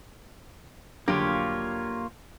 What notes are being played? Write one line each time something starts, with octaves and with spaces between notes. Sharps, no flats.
F1 D3 F#3 A#3 D4 F4 G4 C#5